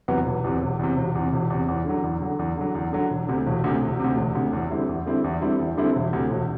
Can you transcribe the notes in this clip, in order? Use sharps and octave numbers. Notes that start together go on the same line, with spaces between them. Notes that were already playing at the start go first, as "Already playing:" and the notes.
E2 C3 F#3 B3
E1
E2 C3
E1
E2 C3
E1
E2 C3
E1
E2 C3
E2
D3 F#3
E2
D3 F#3
E2
D3 F#3
E2
D3 F#3
E1
D2 C3
E1
D2 C3
E1
D2 C3
E1
D2 C3
E2
D3 G3 C4 E4
E2
D3 G3 C4 E4
E2
D3 G3 C4 E4
E2
D3 G3 C4 E4
E1
D2 C3
E1